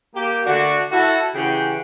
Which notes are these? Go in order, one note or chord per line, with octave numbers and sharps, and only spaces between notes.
A#3 G4
D3 A3 D4 F#4
E4 F#4 A4
C#3 E3 G4 G#4 F#5 G5